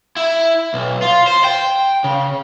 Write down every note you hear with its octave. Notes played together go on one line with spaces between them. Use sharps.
E4
B1
F4
C5
G5
C#3